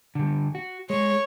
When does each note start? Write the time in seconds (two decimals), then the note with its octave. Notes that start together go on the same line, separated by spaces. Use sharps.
0.15 D3 G3
0.55 F#4
0.90 G#3 C#5